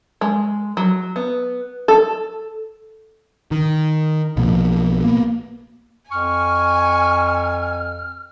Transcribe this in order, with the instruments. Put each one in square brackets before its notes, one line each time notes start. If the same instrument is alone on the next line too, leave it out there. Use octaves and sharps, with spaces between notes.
[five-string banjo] G#3
F#3
B3
A4
[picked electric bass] D#3
B1 B2 F3 A#3
A#3 B3
[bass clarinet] F2 [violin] G#5 [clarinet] C#6 [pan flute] F6